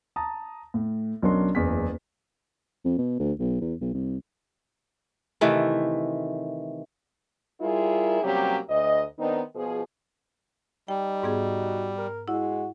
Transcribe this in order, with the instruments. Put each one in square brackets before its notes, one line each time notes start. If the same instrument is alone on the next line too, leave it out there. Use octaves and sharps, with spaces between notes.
[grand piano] A5 A#5 D#6
A2
B1 F#3 C#4 D4 A#4 C6
F#1 E2 B6
[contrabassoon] F2
B2
D2
B1
E2
B1
C2
[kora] C3 D#3 E3 A3
[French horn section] G3 E4 F4 G#4 A#4
C3 F#3 G3 A#3 C#4 G4
D2 D#5
D#3 B3 C4 D4 D#4
B2 F3 G#4
[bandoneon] G3 [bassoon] D#4 [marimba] G5
[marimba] G#2 B3 G#4 [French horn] F#4
[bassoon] A#4
[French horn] G#3 [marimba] E4 [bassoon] F#4